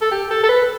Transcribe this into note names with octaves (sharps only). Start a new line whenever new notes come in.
A4
G4
A4
A4
B4